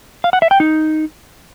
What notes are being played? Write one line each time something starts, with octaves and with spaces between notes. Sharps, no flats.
F5
F#5
E5
G5
D#4